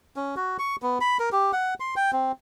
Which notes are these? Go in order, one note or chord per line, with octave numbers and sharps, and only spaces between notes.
C#4
F#4
C#6
B3
B5
A#4
G4
F#5
C6
G5
C4